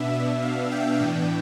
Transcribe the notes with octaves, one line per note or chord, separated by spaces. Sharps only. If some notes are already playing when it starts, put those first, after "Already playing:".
Already playing: B2 B3 D4 E5
E5
F5
G5
A2 E3 B3 D4 G5